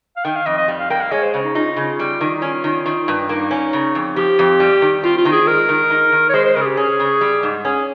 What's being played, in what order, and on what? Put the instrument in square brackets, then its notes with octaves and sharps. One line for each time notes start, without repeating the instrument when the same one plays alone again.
[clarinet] F5
[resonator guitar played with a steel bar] D#3 [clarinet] G5
[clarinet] F5
[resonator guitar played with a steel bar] F2 [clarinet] D#5
[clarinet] D#5
[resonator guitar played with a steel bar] G3
[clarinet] F5
[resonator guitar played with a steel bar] A#3 [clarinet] G5
[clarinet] F5
[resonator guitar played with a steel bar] G#3 [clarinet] C#5
[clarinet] C5
[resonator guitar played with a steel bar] C#3
[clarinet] D#4
[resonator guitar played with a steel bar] D#4 [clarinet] F4
[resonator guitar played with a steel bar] C#3
G3
D#3
[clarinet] D#4
[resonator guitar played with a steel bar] C#4 [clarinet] F4
[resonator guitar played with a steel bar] D#3
D#3
G2
[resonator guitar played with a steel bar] A#3 [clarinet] D#4
[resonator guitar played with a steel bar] C#4
C#3
F2
[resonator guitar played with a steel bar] F3 [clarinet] G4
[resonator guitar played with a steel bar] F2
G3
D#3
[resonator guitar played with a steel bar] C4 [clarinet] F4
[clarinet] F4
[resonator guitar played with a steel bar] D#3
[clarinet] G#4
[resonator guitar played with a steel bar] G#3 [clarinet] A#4
[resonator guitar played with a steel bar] D#3
D#4
D#3
[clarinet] C#5
[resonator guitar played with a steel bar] G#3 [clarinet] C5
[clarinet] C5
[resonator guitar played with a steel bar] C#3 [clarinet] A#4
[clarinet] G#4
G4
[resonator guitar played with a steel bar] C#4 [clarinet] G#4
[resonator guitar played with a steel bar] C#3
G3
G#2
[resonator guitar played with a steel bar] C#4 [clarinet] G#4